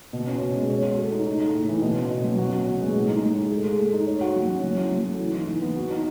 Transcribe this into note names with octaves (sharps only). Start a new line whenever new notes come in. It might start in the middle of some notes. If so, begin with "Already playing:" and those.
B2
C#4
B2
G#3
C#5
F#4
A3
D#4
D#4
A3
A2
E3
B2
C#4
B2
F#3
F#4
C#4
B2
G#3
A2
D#4
A2
G#3
A3
G#4
A3
D#4
C#5
F#4
F#3
C#4
F#3
E4
F#3
A3
E3
D#4
E3
B3
F#4
D#4